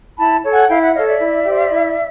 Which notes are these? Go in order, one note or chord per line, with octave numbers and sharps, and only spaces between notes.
E4 A5 B5
A4 C#5
F#5 G#5
E4 F5 G5
E5 F#5
A4 C#5 D#5 F5
D5 E5
E4
G4 C5
E4